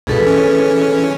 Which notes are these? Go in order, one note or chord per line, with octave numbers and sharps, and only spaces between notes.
C#2 G2 B2 G#4 A4 B4
E3 C#4